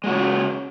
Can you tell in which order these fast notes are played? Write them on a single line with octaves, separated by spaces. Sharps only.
G#3 F#4 C#3